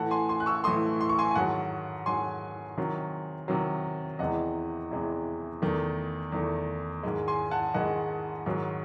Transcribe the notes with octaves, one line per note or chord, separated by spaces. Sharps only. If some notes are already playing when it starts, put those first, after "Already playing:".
Already playing: A2 E3 A3 F#5 A5
G#5 C6
G#5 C6
F#6
C#6 E6
A2 E3 A3 C6 D#6
C6
C#6
G#5 C6
G#5
G#2 D#3 F#3 F#5 A5
G#2 D#3 F#3 G#5 C6
C3 D#3 F#3
C3 D#3 F#3
E2 C3 E3 G#3 D#5 F#5
E2 C3 E3 G#3
E2 D#3 A3
E2 D#3 A3
G#2 D#3 G#3
G#5 C6
F#5 A5
G#2 D#3 G#3 D#5 F#5
G#2 D#3 F#3